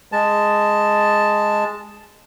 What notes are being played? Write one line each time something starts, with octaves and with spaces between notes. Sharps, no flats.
G#3 A5